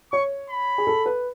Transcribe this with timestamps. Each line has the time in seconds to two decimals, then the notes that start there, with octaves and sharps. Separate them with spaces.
0.12 C#5 C#6
0.50 B5
0.78 G#4
0.87 A4
1.06 B4